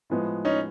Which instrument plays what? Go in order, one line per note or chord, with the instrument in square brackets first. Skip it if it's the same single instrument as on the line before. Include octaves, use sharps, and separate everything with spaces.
[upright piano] A2 F3 G#3 B3
[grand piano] C#4 D#4